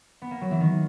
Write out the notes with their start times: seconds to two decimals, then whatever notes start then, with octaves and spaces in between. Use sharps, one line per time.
0.22 B3
0.31 A#3
0.41 F#3
0.51 E3
0.60 D#3